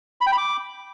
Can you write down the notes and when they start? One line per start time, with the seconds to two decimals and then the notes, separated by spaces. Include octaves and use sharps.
0.21 B5
0.27 G5
0.32 B5
0.38 D6